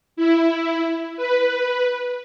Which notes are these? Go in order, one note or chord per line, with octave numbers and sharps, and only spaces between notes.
E4
B4